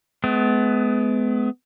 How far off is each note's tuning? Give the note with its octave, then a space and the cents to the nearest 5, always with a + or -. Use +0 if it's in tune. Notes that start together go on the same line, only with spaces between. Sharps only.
G#3 +40 B3 +25